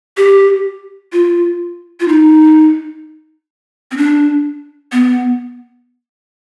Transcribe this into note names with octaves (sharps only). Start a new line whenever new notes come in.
G4
F4
F4
D#4
C4
D4
B3